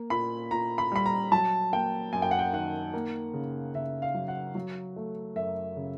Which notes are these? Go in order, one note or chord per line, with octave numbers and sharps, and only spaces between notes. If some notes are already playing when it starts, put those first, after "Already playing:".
Already playing: A#3
A#2 B5
A#2 A#5
B5
G3 B5
A#5
F#3 A5
A#3 G5
F#2 G#5
G5
F#5
G5
D#3 F#5
A#3
C#3
C#3 E5
F5
F#3
F#5
F#3
A3
F#2 E5
C#3